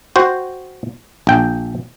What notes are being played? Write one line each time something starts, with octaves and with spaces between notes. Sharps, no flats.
F#4 C5 G5
A#1 G5